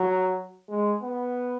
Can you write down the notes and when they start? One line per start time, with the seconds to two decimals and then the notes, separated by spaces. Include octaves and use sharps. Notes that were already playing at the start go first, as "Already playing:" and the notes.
Already playing: F#3
0.69 G#3
1.03 B3